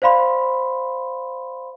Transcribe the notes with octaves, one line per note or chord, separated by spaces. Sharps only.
C5 D5 F5 B5 C6